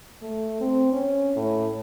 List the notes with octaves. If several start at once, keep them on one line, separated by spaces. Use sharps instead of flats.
A3
C4
C#4
A2